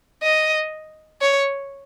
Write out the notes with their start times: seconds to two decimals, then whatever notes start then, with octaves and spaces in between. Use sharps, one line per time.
0.23 D#5
1.21 C#5